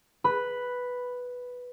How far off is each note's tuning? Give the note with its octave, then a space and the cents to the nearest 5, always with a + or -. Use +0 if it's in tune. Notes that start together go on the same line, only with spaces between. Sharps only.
B4 +0 B5 +0